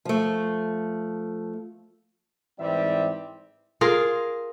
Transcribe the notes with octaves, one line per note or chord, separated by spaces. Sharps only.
F3 A3
G#2 E3 G3 C4 D5 E5
F4 G#4 A#4